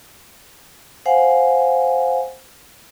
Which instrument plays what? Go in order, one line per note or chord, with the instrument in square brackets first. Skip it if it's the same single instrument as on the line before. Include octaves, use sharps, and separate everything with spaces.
[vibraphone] C5 F5 F#5 G#5